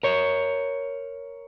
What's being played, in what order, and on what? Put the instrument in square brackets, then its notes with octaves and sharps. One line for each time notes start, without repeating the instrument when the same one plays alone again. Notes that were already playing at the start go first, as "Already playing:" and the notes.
[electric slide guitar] A#4 C#5